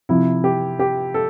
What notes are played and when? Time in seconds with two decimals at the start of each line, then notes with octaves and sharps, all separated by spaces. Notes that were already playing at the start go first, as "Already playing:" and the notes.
0.09 C3 F3 E4
0.44 G4
0.79 G4
1.14 A4